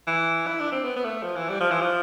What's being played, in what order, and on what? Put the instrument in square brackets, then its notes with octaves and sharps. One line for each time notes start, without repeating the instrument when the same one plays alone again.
[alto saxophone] E3
E4
D4
C4
B3
B3
A3
F3
E3
G3
F3
E3
F3